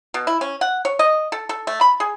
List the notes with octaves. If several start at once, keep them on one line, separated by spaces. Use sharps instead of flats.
B2
E4
C#4
F#5
C#5
D#5
A4
A4
A3
B5
G#4